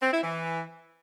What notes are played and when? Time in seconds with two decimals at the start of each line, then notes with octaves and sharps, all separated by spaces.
0.02 C4
0.13 E4
0.23 E3